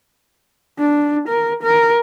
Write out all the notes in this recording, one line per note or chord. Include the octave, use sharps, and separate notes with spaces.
D4
A#4
A#4